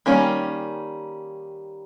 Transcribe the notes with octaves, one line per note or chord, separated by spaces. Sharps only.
D#3 G3 A#3 C#4